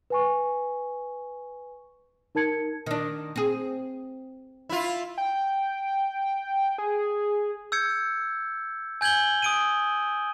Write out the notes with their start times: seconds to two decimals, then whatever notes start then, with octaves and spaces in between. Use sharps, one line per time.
0.10 B4 G#5 C#6
2.35 D#4 A#4 A5 G#6 C#7
2.86 D#3 D4
3.36 C4 G#4
4.69 E4 F4
5.18 G5
6.78 G#4
7.72 E6 G6 G#6 C#7
9.01 G#5 G6 G#6 F#7 G7
9.42 D#6 D7 D#7